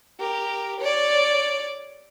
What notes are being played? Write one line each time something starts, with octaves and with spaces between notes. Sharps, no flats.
G4 A#4
C#5 D5